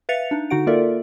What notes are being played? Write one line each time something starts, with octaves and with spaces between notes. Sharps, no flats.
B4 E5 F5 A6 C#7 F7
D4 D#4
D3 D#4 F#4 F#5 D7
A#3 F4 A4 A#4 D5 E5